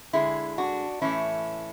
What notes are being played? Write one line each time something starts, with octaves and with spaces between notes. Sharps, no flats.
D3 G#3 E4 G#4
D4 F#4
A2 E3 A3 C#4 E4